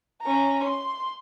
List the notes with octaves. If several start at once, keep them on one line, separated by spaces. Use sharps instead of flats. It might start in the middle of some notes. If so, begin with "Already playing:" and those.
C#4 A#5
C6